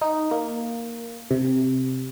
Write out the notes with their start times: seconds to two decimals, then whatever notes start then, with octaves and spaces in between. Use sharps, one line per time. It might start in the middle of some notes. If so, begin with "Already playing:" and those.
0.02 D#4
0.31 A#3
1.31 C3